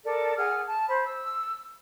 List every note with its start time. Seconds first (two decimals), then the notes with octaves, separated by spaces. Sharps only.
0.03 A4 A#4 D5
0.36 G#4 F#5 G#5 F6
0.66 A5
0.88 C5 B5
1.06 E6